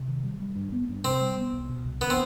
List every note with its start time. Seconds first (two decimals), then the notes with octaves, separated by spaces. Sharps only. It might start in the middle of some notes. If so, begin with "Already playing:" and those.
Already playing: C3
0.08 D#3
0.23 G3
0.40 G3
0.56 G2
0.72 B3
0.88 G2
1.05 C3 C4
1.21 G3
1.37 B3
1.53 C2
1.69 B2
1.85 C2
2.01 D3 B3
2.10 C4